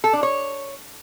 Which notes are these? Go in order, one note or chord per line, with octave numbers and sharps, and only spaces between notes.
A4
D4
C#5